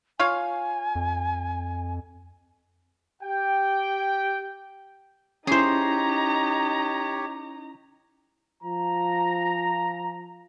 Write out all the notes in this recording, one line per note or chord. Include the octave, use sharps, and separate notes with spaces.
F4 C#5 F5 G#5
F2
G4 G5
C#4 D#4 E4 G4 G#4 C5 C#5 A#5
F3 A#5